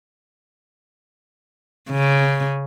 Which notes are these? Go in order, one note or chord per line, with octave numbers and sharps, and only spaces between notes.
C#3